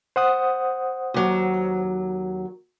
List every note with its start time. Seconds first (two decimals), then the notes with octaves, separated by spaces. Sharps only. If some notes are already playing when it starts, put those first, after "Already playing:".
0.16 C5 F#5 D#6
1.14 D#2 F#3